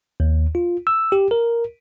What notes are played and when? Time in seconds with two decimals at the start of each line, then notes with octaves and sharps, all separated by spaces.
0.20 D#2
0.55 F4
0.87 E6
1.12 G4
1.31 A#4